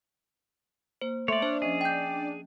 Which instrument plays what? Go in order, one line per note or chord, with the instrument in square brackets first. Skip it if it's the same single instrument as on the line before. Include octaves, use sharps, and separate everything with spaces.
[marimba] A#3 [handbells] C5
[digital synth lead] A3 [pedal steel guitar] C#5 D5 [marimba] E5 C6
[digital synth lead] D4 [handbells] C5
[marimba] F3 C#4 D#5 [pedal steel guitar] G#4
[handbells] G5 G6